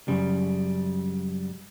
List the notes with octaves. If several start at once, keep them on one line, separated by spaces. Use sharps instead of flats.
F#2 C#3 G3